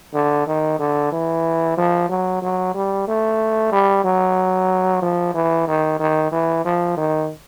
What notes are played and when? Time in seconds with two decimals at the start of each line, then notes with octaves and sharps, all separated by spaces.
0.14 D3
0.47 D#3
0.79 D3
1.12 E3
1.77 F3
2.09 F#3
2.42 F#3
2.74 G3
3.07 A3
3.72 G3
4.04 F#3
5.02 F3
5.34 E3
5.67 D#3
5.99 D#3
6.32 E3
6.65 F3
6.97 D#3